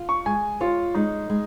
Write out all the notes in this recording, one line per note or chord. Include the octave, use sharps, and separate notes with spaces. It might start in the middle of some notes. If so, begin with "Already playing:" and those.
Already playing: F4
C#6
G#3 G#5
F4 C#5
G#3 D#4
G#3